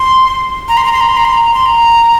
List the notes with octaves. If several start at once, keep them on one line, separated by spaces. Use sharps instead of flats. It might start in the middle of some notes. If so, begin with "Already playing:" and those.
Already playing: C6
A#5
C6
A#5
C6
A#5
C6
A#5
C6
A#5
C6
A#5